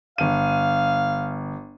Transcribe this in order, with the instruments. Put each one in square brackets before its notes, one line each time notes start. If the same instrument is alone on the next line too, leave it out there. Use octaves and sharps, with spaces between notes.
[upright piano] G1 D#7 [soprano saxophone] F5